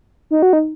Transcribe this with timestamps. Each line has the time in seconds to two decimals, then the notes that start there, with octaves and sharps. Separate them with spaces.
0.31 D#4
0.42 F#4
0.53 D#4